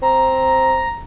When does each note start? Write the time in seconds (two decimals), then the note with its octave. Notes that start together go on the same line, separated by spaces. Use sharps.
0.02 C4 A#5